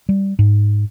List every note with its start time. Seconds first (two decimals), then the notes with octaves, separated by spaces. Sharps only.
0.09 G3
0.39 G#2